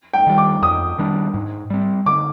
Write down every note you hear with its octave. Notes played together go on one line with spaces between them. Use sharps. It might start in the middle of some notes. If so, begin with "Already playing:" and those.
G5
D#3 G3
D6
F2 D#6
D#3 G3 D4
G#2
G3 C4
D3 D6